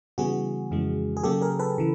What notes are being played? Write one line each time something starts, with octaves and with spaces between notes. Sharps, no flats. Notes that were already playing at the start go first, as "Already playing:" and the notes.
C#3 E3 G3 B3 F#4 G#4
F2 C#3 E3 G#3
G#4
C#3 F#3 A#3 G4 A4
G#4 A#4
A4 B4
C#3 E3